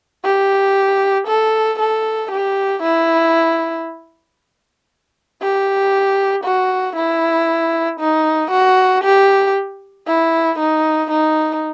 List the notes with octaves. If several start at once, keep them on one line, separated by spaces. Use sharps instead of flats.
G4
A4
A4
G4
E4
G4
F#4
E4
D#4
F#4
G4
E4
D#4
D#4